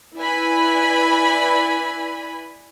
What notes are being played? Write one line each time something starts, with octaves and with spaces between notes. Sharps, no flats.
E4 B4 D5 G#5 B5